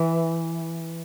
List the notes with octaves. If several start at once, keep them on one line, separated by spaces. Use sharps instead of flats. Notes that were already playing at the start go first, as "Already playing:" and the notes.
Already playing: E3